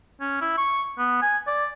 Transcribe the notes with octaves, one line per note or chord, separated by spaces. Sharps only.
C#4
E4
C#6
B3
G#5
D5